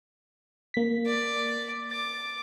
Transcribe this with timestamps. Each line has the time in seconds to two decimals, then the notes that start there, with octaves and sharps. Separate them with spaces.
0.74 A#3 B6
1.06 D5
1.91 D6 A6